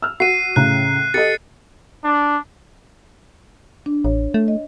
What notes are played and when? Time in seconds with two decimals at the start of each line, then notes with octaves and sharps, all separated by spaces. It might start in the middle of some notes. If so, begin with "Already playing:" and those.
0.02 E6 F6
0.20 F#4 C7 D#7
0.56 A2 C#3 A#5 F#6
1.14 G4 A4 D#5 A6 C#7
2.04 D4
3.86 D4
4.05 A1 C#5
4.34 A3
4.48 D#5